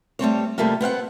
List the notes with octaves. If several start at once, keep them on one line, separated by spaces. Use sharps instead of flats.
G3 A3 C4 C#5
F2 C3 G3 A3 A#3 F4
B3 C4 F5 F#5